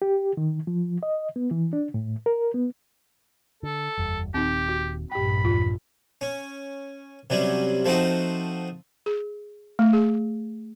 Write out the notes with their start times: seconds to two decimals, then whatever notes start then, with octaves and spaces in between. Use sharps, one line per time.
0.02 G4
0.37 D#3
0.67 F3
1.03 D#5
1.36 B3
1.51 E3
1.73 D4
1.94 A2
2.26 A#4
2.54 B3
3.63 D3 A4
3.98 F#1 E2 G3
4.34 D#1 D#2 C4 D#4 G4
4.69 F#4
5.11 A#1 G2 G4 G5 B5
5.45 E2 F4
6.21 C#4
7.30 C3 F#3 G3 C#4
7.85 F3 A3 C4 D#4 F#4
9.06 G#4
9.79 A3
9.93 G#4